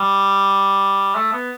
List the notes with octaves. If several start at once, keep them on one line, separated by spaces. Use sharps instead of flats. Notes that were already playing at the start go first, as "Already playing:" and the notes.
Already playing: G3
A3
B3